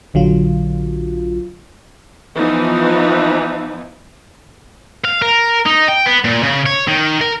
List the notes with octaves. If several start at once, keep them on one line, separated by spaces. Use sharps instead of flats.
A#1 D3 F#3 F4
E3 F3 B3 D#4
F5
A#4
D#4
G5
B3
A#2
C#3
C#5
D#3
A#4